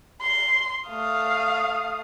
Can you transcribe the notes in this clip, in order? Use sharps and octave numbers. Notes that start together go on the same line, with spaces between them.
C6
A3 F5 D#6